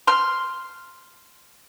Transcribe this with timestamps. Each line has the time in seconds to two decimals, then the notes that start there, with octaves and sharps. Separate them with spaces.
0.07 C6 F6